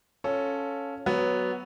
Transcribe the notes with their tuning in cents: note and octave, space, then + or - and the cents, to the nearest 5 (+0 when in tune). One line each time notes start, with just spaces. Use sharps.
C#4 +0 F4 +10 A4 +0
F#3 +10 B3 +0